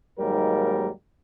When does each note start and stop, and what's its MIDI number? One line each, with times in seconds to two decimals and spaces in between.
0.18 0.89 39
0.18 0.89 44
0.18 0.89 54
0.18 0.89 55
0.18 0.89 58
0.18 0.89 70